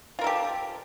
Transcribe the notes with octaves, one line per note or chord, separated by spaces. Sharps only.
F4 G4 A4 A#4